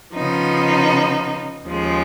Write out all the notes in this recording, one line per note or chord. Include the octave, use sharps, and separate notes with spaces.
C#3 F3 B3 D#4
D#2 C#3 F3 G#3